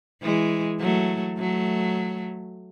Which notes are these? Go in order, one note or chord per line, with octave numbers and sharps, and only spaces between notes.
E3 G#3
F#3 A3
F#3 A3